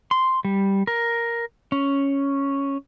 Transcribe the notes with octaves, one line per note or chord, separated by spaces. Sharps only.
C6
G3
A#4
C#4